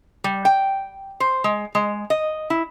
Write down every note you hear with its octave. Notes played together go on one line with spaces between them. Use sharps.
G3
G5
C5
G#3
G#3
D#5
E4